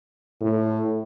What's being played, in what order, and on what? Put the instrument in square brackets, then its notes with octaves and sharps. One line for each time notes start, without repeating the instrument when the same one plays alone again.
[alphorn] A2